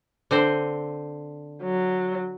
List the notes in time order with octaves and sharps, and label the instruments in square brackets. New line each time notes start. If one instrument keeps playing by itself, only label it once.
[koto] D3 C4 C5
[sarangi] F#3